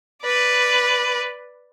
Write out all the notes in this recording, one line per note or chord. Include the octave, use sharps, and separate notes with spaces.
B4 D5